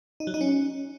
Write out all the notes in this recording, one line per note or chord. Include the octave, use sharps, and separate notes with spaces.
D#4
F#3
D#4
C#4